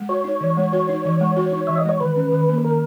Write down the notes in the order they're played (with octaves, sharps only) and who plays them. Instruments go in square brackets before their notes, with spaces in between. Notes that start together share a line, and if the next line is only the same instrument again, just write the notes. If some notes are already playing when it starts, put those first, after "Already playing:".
Already playing: [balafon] G#3
[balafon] F#4 [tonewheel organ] C#5
[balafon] D#4
E3
G#3
F#4
D#4
E3
G#3
F#4
D#4
[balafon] E3 [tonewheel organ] E5
[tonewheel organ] D#5
[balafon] G#3 [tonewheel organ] C#5
[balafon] D#3 [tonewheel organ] B4
[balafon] C#4
D#3
A#3
[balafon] D#3 [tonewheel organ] A#4